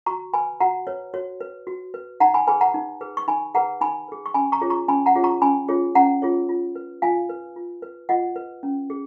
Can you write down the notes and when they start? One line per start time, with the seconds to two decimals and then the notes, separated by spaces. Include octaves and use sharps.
0.06 F#4 A#5 C#6
0.34 B4 G#5 B5
0.60 F#4 F#5 A#5
0.87 B4 C#5
1.14 F#4 C#5
1.41 B4
1.67 F#4
1.94 B4
2.20 D#4 F#5 A#5
2.34 G#5 B5
2.47 G#4 B4 G#5 B5
2.61 F#5 A#5
2.74 D#4
3.01 G#4 B4
3.17 C#6
3.28 D#4 G#5 B5
3.54 G#4 B4 F#5 A#5
3.81 D#4 G#5 B5
4.08 G#4 B4
4.26 C#6
4.34 C#4 G#5 B5
4.52 A#5 C#6
4.62 F4 G#4 C#5
4.70 A#5 C#6
4.88 C#4 G#5 B5
5.06 F#5 A#5
5.15 F4 G#4 C#5
5.24 A#5 C#6
5.42 C#4 G#5 B5
5.68 F4 G#4 C#5
5.95 C#4 F#5 A#5
6.22 F4 G#4 C#5
6.49 F4
6.76 B4
7.02 F4 F5 G#5
7.29 B4
7.56 F4
7.82 B4
8.09 F4 D#5 F#5
8.36 B4
8.63 C#4
8.90 G#4